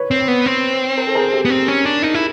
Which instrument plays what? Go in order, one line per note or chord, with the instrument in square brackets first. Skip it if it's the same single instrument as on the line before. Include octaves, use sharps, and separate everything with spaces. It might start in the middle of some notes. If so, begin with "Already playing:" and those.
Already playing: [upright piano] B4 C#5
[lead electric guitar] C4
B3
C4
[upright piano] A#4 C5
A4
G#4 A#4
G4 A4
[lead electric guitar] B3
C4
C#4
D4
D#4
E4